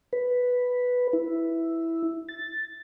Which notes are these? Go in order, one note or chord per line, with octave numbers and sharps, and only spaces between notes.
B4
E4
A6